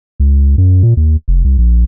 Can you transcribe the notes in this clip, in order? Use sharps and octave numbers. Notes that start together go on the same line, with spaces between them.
C#2
F#2
A#2
D#2
F1
C2
A#1